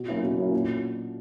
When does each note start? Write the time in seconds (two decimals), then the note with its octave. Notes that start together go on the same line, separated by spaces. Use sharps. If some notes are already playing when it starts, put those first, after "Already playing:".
Already playing: B2
0.08 F#3 A#3 C#4 E4
0.23 B2
0.38 F#3 A#3 C#4 E4
0.53 A#2